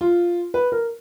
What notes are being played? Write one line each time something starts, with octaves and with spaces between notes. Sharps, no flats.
F4
B4
A#4